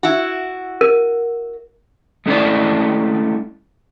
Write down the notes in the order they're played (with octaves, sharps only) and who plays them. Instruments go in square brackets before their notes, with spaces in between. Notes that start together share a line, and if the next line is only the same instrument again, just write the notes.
[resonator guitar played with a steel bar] E4 F#4
[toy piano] A#4
[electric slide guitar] G#3 A3 C#4 D#4 E4 D5